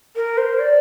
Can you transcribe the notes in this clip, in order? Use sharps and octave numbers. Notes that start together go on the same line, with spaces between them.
A#4
C5
D5